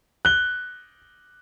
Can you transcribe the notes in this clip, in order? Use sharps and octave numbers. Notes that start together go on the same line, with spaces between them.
F#6 G7